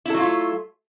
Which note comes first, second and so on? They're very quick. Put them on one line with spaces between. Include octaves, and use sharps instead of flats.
E4 A4 F#3 F4 A3